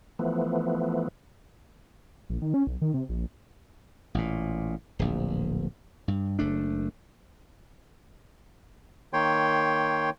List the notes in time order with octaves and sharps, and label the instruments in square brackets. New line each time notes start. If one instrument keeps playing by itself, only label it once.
[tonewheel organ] E3 F3 A3 B3
[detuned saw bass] A#1
D#3
C#4
B1
D#3
C3
A#1
[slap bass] A1 A#2
D1 A#1
G2
F#1 A3 D4
[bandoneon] D#3 A#3 C#5 G5 C6